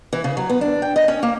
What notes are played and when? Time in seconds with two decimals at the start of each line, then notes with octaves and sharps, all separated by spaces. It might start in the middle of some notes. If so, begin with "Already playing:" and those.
0.13 E3
0.24 C#3
0.37 F#3
0.49 B3
0.61 D4
0.82 G5
0.96 D#5
1.08 C#4
1.23 A#3